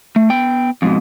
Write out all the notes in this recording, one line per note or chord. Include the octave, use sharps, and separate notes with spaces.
A3
B3 G5
F2 G#2 B2